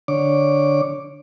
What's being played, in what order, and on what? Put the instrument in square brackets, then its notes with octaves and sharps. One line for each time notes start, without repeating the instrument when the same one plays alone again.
[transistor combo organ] D3 C#5 D6